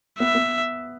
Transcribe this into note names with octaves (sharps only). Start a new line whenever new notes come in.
B3 E5
B3